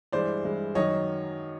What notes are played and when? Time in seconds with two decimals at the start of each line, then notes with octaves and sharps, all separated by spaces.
0.12 G2 E3 G#3 C5 D5
0.44 G2 E3 G#3
0.75 F#2 D#3 F#3 C#5 D#5